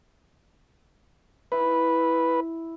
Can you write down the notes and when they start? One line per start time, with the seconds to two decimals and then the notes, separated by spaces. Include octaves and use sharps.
1.52 E4 B4